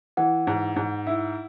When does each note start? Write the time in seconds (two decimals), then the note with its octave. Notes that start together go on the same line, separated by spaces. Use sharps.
0.17 E3 F#5
0.47 G#2
0.76 G#2
1.07 E4